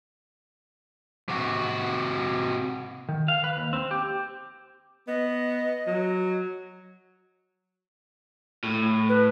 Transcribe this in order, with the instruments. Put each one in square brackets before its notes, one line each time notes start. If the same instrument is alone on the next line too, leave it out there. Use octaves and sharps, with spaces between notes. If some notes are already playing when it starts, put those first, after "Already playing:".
[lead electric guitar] C3 F#4
[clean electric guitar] D#3
F5
B4
D#2
C4
G4
[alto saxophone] B3 [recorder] D#5
[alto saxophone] F#3
[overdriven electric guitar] A2
[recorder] B4